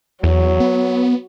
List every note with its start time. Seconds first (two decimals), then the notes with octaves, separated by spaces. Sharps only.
0.23 E2 F#3
0.60 B3